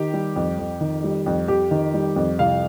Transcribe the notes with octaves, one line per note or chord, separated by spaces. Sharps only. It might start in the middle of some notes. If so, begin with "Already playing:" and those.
Already playing: D#3 G4
G3
F2
F2
D#3
G3
F2
F2 G4
D#3
G3
F2
C2 F5